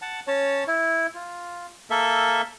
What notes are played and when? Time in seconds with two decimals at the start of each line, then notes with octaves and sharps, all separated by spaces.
0.02 F#5 A5
0.27 C#4 C#5 A5
0.67 E4
1.15 F4
1.90 A#3 A4 E5